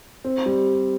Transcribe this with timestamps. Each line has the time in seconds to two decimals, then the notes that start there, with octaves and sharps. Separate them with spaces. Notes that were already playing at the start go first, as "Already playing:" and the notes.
0.24 C4
0.46 G3